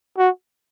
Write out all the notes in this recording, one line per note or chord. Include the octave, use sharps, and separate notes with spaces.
F#4